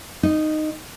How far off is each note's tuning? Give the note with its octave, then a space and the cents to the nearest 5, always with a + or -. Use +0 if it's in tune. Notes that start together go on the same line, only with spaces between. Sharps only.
D#4 -10